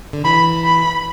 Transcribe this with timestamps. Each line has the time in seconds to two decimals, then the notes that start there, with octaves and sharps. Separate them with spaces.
0.13 D3
0.25 E3 B5
0.65 B5